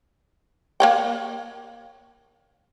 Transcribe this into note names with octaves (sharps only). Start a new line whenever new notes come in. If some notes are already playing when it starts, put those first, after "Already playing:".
A#3 C#5 G5